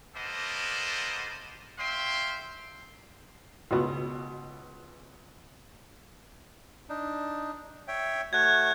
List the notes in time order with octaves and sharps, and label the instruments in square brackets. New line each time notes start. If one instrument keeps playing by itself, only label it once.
[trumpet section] A#3 B3 A4 C5 D5 D#5
C#5 E5 F5 G5 C6
[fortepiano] C#2 B2 B3
[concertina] D4 D#4
C#5 E5 G5
[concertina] A3 F#4 C#5 [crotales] F#6 G#6